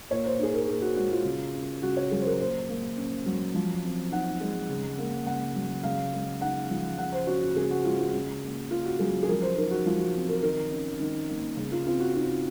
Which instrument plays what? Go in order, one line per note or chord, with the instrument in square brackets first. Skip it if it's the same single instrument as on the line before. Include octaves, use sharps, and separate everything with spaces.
[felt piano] A#2 C#5
C5
D#4 G#4
A#4
A#2 G#4
F#4
G#3 F#4
F4
C#3
C#4
C#3 F#4
C#5
F#3 G#4
C5
A#4
A#2 C5
A#3
C#4
F#3
F3
C4
D#4 F#5
G#3
C#3
A#3
C#3 F#5
F#3
C#3 F5
G#3
D#4 F#5
F3
C#3 F#5
C5
C#4 F#4
F#4
C#3 G#4
F#4
G#3 F4
F4
C#3
A#3
C#4 F4
F#4
F#3 G#4
G#4
F3 A#4
C5
D#4 A#4
F#4
F3 F4
F#4
C4
A#4
D#3 A#4
C#4
D#3
A#3
C#3
F4
C4 F4
F#4
D#4 F4